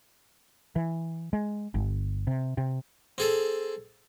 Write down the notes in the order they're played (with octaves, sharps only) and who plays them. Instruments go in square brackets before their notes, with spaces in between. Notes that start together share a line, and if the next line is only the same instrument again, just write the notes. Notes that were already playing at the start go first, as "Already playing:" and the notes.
[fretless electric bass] E3
G#3
G1
C3
C3
[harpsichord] C4 G#4 A4